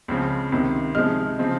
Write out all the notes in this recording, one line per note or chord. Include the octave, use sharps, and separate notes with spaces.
C#2 C#3 F3 C4
C#2 C3 D#3
C3 F3 G#3 D#4 F6
C#3 F3 C4 D#4